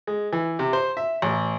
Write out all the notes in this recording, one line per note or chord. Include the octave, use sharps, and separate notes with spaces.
G#3
E3
C3
C5
E5
A1